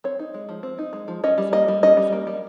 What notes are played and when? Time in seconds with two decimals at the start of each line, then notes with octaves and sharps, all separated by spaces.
0.04 C4 C#5
0.19 D#4
0.34 G#3
0.49 F3
0.63 C4
0.79 D#4
0.93 G#3
1.08 F3
1.24 C#4 D#5
1.38 G3
1.52 A#3 D#5
1.68 G3
1.83 C#4 D#5
1.97 G3
2.12 A#3
2.27 G3